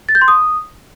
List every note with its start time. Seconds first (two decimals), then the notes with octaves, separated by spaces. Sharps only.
0.09 A6
0.15 G6
0.21 C6
0.28 D#6